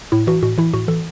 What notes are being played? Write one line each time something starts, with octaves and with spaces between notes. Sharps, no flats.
A2 E4
E3 F#4
A2 F#4
E3 E4
A2 F#4
E3 A4